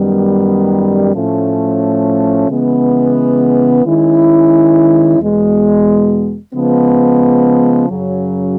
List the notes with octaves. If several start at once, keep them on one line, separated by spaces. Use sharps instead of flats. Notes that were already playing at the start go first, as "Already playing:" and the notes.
Already playing: F#2 D#3 G3 B3
A2 F3 A3 C#4
C#3 E3 G#3 B3
D#3 G#3 C#4 E4
E2 B2 G#3
C#3 F3 G#3 B3
F#2 C#3 F#3